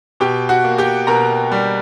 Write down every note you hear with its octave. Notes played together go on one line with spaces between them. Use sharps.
B2 G4 G5
F#4 F#5
A#3
G4 G5
B2 A#4 A#5
G3